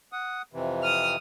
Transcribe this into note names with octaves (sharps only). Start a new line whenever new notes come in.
F#5 D#6
F2 C3 E3
D#6 F6